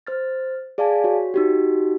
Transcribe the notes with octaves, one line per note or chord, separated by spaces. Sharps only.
C5 F6 A6
G#4 D5 F5 G#5 A5
F#4 C#5
D#4 F#4 G4